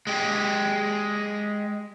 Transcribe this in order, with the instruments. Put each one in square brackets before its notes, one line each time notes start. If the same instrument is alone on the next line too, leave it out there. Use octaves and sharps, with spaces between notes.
[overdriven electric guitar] G#3 G4